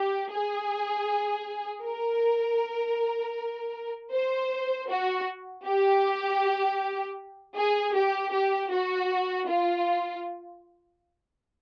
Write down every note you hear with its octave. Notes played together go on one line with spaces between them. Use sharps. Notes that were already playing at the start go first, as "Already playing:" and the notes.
Already playing: G4
G#4
A#4
C5
F#4
G4
G#4
G4
G4
F#4
F4